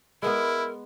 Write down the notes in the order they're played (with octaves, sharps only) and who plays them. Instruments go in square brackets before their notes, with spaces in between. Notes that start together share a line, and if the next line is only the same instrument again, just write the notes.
[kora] G#3 B3 [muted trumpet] E4 [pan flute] A#4